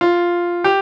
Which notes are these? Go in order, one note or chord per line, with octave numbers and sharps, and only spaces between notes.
F4
G4